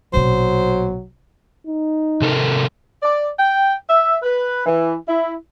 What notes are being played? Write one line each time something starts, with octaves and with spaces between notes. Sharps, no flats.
A#1 B2 F#3 C5
D#4
C3 A4 A#4
D5
G5
E5
B4
E3
E4